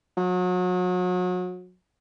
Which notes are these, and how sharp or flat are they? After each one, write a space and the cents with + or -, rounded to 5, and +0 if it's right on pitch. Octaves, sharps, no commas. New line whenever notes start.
F#3 -35